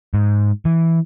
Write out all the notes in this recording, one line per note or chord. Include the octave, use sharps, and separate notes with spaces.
G#2
E3